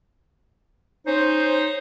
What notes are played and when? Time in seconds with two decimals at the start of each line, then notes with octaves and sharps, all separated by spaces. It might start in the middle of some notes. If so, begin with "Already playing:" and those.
1.07 C#4 D#4 C5